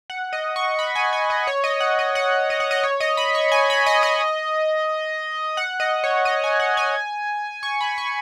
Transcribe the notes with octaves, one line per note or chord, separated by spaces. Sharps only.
F#5
D#5
C#6
B5
G#5
G#5
D#5
C#5
D#5
F#5
D#5
F#5
D#5
F#5
D#5
C#5
D#5
B5
C#6
G#5
B5
D#5
D#5
F#5
D#5
C#5
D#5
G#5
F#5
G#5
C#6
B5
C#6